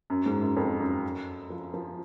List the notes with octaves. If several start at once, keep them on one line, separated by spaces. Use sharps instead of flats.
F#2
G#2
F#2
F2
F#2
F3
F3